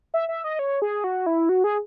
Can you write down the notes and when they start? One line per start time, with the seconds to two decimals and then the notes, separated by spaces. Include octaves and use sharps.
0.14 E5
0.29 E5
0.44 D#5
0.59 C#5
0.82 G#4
1.04 F#4
1.26 E4
1.49 F#4
1.64 G#4